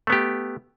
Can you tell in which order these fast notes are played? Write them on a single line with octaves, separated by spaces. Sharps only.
A3 B3 G4